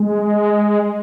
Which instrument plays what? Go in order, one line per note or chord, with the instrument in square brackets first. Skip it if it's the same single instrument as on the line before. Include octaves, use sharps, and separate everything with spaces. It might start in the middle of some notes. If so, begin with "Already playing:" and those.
Already playing: [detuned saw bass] G#3